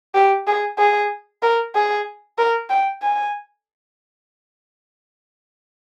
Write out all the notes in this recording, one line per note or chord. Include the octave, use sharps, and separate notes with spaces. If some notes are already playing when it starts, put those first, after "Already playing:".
G4
G#4
G#4
A#4
G#4
A#4
G5
G#5